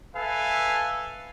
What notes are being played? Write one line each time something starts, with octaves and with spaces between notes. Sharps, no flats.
A4 B4 E5 F5 G#5